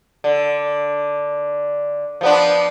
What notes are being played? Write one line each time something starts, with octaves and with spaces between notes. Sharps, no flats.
D3
F3 B3 D4